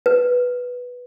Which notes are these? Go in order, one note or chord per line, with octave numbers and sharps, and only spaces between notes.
B4